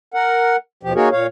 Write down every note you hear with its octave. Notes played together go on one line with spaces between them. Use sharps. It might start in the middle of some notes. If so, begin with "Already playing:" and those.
A#4 F#5
D#2 B2 F3 G4
A#3 D#4 F#4 G#4 A#4 C#5
A#2 C#5 F5